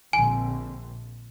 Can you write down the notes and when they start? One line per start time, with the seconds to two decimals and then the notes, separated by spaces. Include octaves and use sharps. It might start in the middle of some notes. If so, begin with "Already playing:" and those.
0.13 A#1 D3 C4 G#5